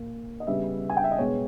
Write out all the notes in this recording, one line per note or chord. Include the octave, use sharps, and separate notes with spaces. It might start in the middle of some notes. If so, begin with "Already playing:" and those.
Already playing: A#2 A#3
D#5
C#3 G3 B3 E5
G#5
G5
E5
D#5
B2 G#3 B3 C#5